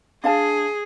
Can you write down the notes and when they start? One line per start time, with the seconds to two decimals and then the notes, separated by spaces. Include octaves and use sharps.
0.24 D4 G#4 F5 A5